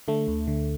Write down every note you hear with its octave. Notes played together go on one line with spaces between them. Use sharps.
D3 A3
D2
D3